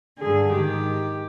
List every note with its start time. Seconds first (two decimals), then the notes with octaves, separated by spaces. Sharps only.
0.19 G2 D3 G#4
0.52 G#2 D#3 G4